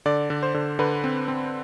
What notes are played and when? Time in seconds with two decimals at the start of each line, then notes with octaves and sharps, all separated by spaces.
0.06 D3 D5
0.30 D3
0.43 C5
0.54 D3
0.79 D3 B4
1.04 C4
1.28 C4